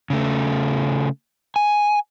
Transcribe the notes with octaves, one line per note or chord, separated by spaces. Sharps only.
C#3 A3
G#5